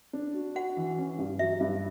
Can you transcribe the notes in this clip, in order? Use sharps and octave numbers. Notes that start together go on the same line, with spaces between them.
D4
F#4
F#4 F#5
E3
C#4
G2
F#3 E5
G2